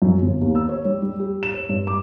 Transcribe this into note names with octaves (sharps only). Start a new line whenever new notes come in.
F#2
G1
D#2
E6
C#5
G3
G3
G4
E7
C#5
G2
D6